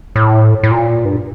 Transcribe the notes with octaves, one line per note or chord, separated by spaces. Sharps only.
A2
A2
A#2
G2